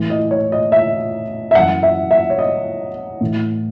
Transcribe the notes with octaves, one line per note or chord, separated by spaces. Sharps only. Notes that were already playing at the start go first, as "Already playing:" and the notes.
Already playing: A2 E3
D#5
C#5
D#5
E5
E5
F#2 E3 F#5
E5
E5
C#5
D#5
A2 E3